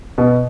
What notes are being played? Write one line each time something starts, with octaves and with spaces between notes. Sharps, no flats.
B2